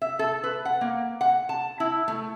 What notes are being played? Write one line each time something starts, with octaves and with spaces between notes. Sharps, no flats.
E5
A4
B4
F#5
A#3
F#5
A5
E4
A3